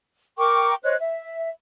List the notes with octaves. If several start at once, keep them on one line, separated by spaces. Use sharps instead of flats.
A#4 G5 C#6 D6
C5 C#5 D#5 F#6
E5